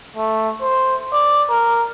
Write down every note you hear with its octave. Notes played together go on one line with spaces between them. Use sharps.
A3
C5
D5
A#4